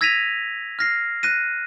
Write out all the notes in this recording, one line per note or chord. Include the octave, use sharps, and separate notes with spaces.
E6 G#6 A#6 B6 D#7 F7
F6 A#6 C7
F#6 A#6 D#7